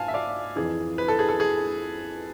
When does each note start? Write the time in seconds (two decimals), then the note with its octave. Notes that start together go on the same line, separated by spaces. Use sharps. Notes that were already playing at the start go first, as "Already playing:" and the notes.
Already playing: G#2 F5 G#5 A5
0.08 E5
0.14 D5 F5
0.56 F2 E3 G#4
0.98 B4
1.08 A4
1.19 G#4
1.29 A4
1.40 G#4